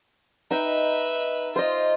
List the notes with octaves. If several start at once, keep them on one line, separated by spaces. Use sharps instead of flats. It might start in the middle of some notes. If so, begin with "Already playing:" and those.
D#4 B4 E5 G5
F4 C5 D#5